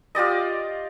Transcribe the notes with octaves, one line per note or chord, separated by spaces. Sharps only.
F4 G4 D5 D#5